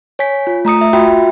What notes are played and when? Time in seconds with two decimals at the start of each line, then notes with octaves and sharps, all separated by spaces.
0.19 C#5 G#5 B6
0.47 F4
0.65 A3 A#5 D#6 C#7
0.81 E5
0.93 F4 F#4 E5 G5 B5